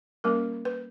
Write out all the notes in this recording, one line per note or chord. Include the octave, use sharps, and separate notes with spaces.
G3 A#3 C#4 A#4
B4